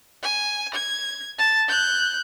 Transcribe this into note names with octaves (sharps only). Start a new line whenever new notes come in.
G#5
G#6
A5
F#6 G6